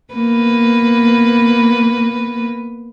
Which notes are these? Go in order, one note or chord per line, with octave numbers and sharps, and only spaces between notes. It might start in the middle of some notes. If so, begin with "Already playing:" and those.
A#3 B3 B4